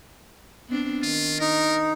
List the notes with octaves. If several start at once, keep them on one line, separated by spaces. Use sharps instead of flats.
B3 C4 D4
D#3 F4
D#4 A#4